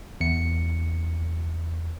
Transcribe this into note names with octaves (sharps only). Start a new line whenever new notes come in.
E2 C#7